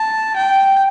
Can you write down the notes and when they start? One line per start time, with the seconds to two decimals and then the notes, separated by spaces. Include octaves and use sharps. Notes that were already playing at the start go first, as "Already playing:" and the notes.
Already playing: A5
0.36 G5